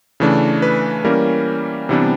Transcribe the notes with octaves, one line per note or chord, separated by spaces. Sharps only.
C#3 E3 A3 D4
B4
E3 G3 A#3 C#4 A#4
C3 E3 G3 B3 D4